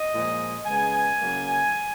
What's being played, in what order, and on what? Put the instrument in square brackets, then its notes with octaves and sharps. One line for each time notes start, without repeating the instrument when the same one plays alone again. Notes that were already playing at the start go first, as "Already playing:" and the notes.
Already playing: [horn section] D#5
A#2 F3 G#3
C#3 G#3 B3 G#5
C#3 F#3 A#3